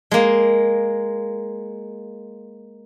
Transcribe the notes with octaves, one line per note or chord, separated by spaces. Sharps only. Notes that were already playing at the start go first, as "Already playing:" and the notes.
G#3 A#3